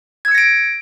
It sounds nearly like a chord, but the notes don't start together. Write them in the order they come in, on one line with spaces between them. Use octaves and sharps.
G#6 E6 C#7 A#6 D7